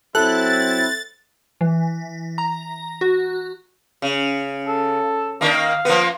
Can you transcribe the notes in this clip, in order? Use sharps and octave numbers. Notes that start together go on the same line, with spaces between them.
F#3 C4 E4 A4 F#6 A6
E3
A#5
F#4
C#3
A4
D#3 A#3 D4
F5
F3 A#3 B3